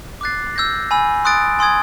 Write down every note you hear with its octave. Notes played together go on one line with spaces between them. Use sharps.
D6 F#6 A6 C7
E6 G6 A#6
G#5 B5 E6
C6 D#6 F#6 A6 D7
G#5 C6 D#6 G#6